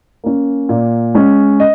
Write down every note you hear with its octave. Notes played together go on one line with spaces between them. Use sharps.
A#3 C#4
A#2
G#3 C#4
D#5